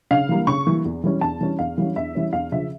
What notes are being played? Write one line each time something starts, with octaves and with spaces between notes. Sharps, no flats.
C#3 F5
E3 G3 A#3
C#3 C#6
E3 G3 A#3
E2
E3 G3 C#4
E2 A5
E3 G3 C#4
E2 F5
E3 G3 C#4
E2 E5
E3 G3 C#4
E2 F5
C#3 F3 C#4 E5